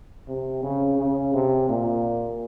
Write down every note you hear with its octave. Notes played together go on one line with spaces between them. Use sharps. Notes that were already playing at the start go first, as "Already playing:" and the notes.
C3
C#3
C#3
C3
A#2